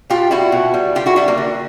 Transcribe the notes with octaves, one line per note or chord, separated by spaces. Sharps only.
B2 F4 G4
G3 E4 F#4
B2
G3
D3 F4 G4
E4 F#4
G3 D4 E4
A#3
D3